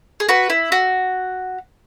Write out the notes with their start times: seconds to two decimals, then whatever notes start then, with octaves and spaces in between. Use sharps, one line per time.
0.20 G#4
0.29 F#4 B4
0.50 E4
0.72 F#4